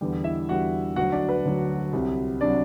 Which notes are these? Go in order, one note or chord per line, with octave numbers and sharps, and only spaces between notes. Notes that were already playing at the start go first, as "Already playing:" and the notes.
E2 D3 G3
E4 E5
E2 D3 G3 F#4 F#5
D2 D3 F#3 F#4 F#5
D4 D5
B4
D2 D3 F#3
C2 C3 F#3
C3 F#3 D4 D5